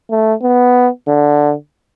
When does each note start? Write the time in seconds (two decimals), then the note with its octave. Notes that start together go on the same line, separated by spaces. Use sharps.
0.11 A3
0.42 B3
1.08 D3